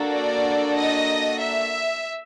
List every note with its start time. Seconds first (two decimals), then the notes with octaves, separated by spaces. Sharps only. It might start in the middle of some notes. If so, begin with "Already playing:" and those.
Already playing: A#3 D4 F#4 A4
0.13 D5
0.77 D#5
1.40 E5